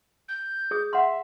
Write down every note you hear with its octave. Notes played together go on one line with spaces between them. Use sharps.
G6
G#4 D#6
E5 F#5 C6